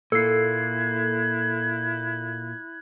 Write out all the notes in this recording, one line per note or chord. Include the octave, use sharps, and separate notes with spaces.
A#2 A#3 E4 A4 F#6 G#6 C7